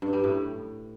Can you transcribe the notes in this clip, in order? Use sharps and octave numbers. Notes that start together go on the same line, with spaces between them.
G2
G3
A2